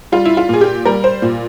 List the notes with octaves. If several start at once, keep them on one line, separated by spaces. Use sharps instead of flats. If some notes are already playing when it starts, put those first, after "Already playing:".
G3 F4
E4
F4
A#2 G#4
G4
G3 A#4
C5
A#2